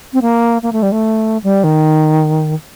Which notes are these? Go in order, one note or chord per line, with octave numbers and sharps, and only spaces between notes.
C4
A#3
A#3
A3
G3
A3
G3
D#3